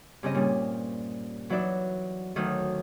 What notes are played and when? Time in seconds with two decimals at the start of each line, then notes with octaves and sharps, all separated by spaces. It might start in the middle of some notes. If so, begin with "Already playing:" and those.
0.23 G2 C#3 C4 D#5
0.35 A#2 G3 C4 C#4
1.49 E3 F#3 D#4 B4 D5 E5
2.36 D2 D#3 F#3 A3 D#6